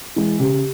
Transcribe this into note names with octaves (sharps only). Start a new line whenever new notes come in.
E3 G#3
C#3 G4